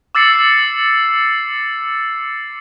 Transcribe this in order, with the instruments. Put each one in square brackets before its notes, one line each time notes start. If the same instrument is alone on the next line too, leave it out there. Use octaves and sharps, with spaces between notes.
[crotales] D6 E6 A6 C7 C#7